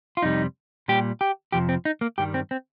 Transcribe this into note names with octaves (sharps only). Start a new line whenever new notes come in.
F4
F2 C3 G3 D#4
A#2 G3 G4
G4
F2 C3 F3 G4
C4
D#4
A#3
G2 D#3 G3 G4
C4
C4